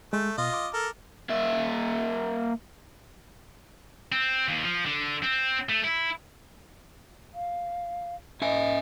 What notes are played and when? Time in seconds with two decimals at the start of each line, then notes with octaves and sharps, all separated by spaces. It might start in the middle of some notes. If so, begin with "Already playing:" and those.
0.13 G#3 A3
0.38 B2 F4 D#5
0.54 D6
0.74 A4 A#4
1.30 A#3 E5
4.12 C4
4.48 D#2
4.63 F3
4.86 D3
5.23 C4
5.69 A3
5.84 E4
7.34 F5
8.42 C#4 D#5 E5 G#5